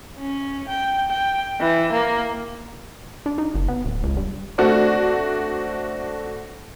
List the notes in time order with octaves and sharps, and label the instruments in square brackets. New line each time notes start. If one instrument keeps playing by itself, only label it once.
[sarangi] C#4
G5
G5
E3
A#3
[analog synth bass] D4
D#4
F#1
B3
D1
C#2
G2
[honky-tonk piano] A3 C4 D4 F#4